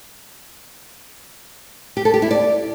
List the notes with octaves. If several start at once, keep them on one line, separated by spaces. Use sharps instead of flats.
G4
A4
G4
E4
D5